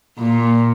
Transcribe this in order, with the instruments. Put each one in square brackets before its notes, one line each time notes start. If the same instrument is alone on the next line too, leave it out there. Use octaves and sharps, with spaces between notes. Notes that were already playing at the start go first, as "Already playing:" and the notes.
[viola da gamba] A#2